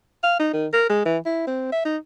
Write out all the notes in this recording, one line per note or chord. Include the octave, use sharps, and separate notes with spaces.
F5
D#4
D#3
A#4
G#3
E3
E4
C4
E5
D#4